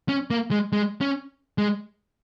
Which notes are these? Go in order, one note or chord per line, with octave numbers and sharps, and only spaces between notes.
C#4
A#3
G#3
G#3
C#4
G#3